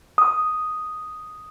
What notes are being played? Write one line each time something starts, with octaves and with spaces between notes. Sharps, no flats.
D#6